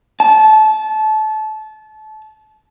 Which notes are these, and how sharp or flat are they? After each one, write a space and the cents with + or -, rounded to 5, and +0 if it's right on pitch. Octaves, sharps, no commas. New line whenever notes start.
A5 -25